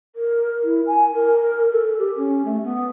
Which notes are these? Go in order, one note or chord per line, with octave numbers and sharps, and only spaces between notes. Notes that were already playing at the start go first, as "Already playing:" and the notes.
A#4
E4
G#5
A#4
A4
G4
C#4
A3
B3